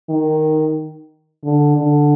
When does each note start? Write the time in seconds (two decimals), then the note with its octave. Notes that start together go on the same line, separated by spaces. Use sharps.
0.09 D#3
1.44 D3
1.78 D3